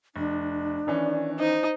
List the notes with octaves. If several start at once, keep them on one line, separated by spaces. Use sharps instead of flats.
F1 D4
D#3 E3 C#4 D5
D#4 C5